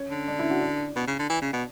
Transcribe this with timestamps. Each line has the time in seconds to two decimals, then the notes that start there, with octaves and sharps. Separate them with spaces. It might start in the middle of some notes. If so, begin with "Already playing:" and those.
Already playing: C#4
0.10 D3
0.28 D4
0.39 E4
0.50 F#4
0.61 D4
0.96 B2
1.07 C#3
1.19 D3
1.30 E3
1.41 C#3
1.53 B2